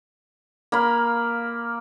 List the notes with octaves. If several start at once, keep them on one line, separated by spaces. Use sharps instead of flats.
A#3 F5 B5